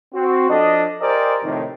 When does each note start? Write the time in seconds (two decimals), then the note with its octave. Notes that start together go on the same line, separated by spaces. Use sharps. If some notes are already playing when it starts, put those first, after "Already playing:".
0.13 C4 F#4
0.49 F3 D4 A4 D#5
1.01 G4 A#4 C5 D5 D#5 G#5
1.43 F2 A2 C3 D#3